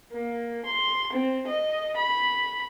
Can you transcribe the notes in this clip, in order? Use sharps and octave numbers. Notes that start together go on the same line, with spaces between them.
A#3
C6
C4
D#5
B5